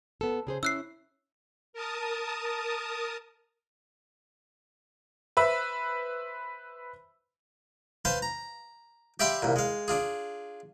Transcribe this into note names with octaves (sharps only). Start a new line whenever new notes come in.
B3 A4
C#3 G#4 C5
C#4 E4 E6 F#6 C7
A#4 A5 D#6
B4 C5 E5 B5
B4 C5 F5 A5 C6
A#5
G4 D5 E5 F5 B5 C6
C2 A#2
G#3 F5
D4 F4 G#4